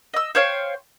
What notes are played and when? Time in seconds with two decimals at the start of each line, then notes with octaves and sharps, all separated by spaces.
0.14 D#5 E6
0.35 C5 C#5 F5 G5